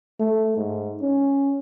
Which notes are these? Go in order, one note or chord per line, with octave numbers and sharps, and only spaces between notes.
A3
G#2
C#4